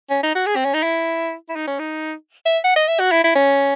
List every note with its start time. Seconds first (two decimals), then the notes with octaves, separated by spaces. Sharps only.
0.10 C#4
0.23 D#4
0.35 F#4
0.47 G#4
0.56 C4
0.65 C#4
0.74 D#4
0.83 E4
1.49 E4
1.56 D#4
1.67 C#4
1.79 D#4
2.46 E5
2.64 F#5
2.76 D#5
2.88 E5
3.00 F#4
3.11 E4
3.24 E4
3.36 C#4